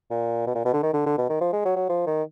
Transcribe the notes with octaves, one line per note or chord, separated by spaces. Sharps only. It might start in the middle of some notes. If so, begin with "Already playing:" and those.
A#2
B2
A#2
B2
D3
D#3
D3
D3
B2
D#3
F3
G#3
F#3
F#3
F3
D#3